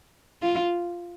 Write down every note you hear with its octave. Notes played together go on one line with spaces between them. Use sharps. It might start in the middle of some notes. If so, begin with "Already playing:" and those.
F4